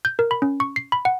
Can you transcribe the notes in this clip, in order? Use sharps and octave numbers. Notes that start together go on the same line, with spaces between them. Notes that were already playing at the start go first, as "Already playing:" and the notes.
G6
A#4
B5
C#4
C#6
C7
B5
F#5